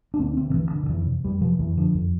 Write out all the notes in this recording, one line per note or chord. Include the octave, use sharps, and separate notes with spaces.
D4
D2 C4
D3 C4
D3
D2 E3
D3
D3
F2 E3
C3
F2 G3
C3 F3
F2 E3
D3 F3
F2